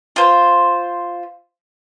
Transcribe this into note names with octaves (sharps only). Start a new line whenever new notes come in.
F4 C5